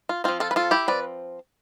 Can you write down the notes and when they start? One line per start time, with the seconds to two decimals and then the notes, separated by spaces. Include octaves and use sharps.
0.09 F4
0.24 F3 C4 F4
0.40 F4 A4
0.51 B4
0.56 F4 A4
0.71 E4 G4
0.88 F3 C4 B4 D5